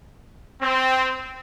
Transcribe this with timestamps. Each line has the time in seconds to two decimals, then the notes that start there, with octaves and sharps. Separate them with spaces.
0.62 C4